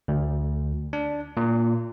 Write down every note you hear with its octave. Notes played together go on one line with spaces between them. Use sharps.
D2
D4
A#2